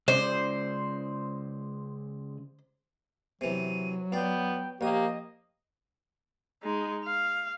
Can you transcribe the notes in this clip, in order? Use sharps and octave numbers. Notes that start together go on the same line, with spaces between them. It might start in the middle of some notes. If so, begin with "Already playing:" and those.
C#3 G#3 C5 D5
C3 E3 F#3 D#7
B3 F4 D5 G5
A#1 A#3 G4 D#5 D#6
G#3 D#4
F5